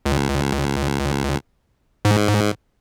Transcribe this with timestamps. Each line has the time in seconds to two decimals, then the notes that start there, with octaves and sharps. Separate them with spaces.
0.06 C#2
2.05 G#2